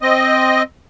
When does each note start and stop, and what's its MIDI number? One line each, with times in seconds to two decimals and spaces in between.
0.02 0.62 60
0.02 0.62 75